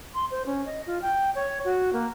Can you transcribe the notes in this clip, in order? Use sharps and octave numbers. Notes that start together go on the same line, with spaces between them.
C6
C5
C#4
D#5
F4
G5
C#5
F#4
A#3